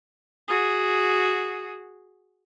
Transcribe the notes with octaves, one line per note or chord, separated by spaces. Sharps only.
F#4 G#4